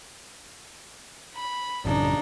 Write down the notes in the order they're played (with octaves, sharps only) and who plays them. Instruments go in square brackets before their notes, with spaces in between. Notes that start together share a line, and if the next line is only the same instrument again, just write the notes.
[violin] B5
[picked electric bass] A1 F#2 C#3 [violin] D4 D#4